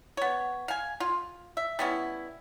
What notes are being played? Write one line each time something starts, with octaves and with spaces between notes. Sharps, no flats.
B3 C#5
F5 G#5
F4
E5
G3 B3 C#4 E4